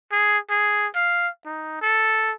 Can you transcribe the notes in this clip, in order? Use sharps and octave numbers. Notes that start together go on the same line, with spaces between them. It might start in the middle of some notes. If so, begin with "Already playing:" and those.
G#4
G#4
F5
D#4
A4